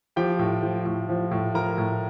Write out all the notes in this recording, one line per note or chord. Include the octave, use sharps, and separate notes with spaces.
F3 G4 G5
A2
F3
A2
F3
A2
F3 A#4 A#5
A2